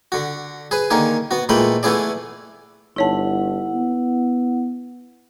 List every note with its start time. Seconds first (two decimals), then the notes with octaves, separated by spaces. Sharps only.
0.12 D3 F#4
0.71 G#4 B4
0.90 D3 D#3 A#3 G#4
1.31 B3 F#4
1.49 A#2 E3 G#3 A3 G5 B5
1.83 E3 A3 B3 E4 G#4 D5
2.96 G1 D#4 E4 C#5 F#5 A5
3.75 B3